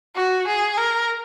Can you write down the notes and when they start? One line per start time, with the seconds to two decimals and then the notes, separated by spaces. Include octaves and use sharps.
0.16 F#4
0.47 G#4
0.78 A#4